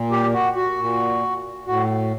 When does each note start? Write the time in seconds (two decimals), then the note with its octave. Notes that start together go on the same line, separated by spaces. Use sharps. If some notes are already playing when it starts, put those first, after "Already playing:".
Already playing: A#2
0.11 G4
0.34 F#4
0.56 F#4
0.79 A#2
1.67 A2 F#4